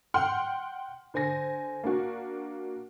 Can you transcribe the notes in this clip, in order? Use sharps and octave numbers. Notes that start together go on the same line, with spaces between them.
F#5 G5 C6 F6
D3 C5 G#5 A#6
A#3 D4 F#4